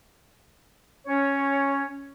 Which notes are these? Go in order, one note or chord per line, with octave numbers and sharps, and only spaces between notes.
C#4 C#5